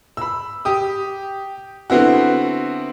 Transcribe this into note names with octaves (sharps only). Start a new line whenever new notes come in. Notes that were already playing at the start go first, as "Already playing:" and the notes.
B5 E6
G4 D#6
D3 B3 C4 E4 F#4